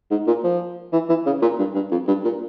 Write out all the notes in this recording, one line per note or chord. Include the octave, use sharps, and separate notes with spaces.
G#2
A#2
F3
E3
E3
C#3
A#2
G2
G2
F2
G2
A#2